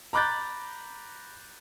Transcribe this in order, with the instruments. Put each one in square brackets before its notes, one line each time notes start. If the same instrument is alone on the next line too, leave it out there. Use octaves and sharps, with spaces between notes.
[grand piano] A#5 B5 D6 F#6 G6 A6